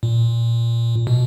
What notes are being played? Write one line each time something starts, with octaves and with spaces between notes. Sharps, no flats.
A#2
B2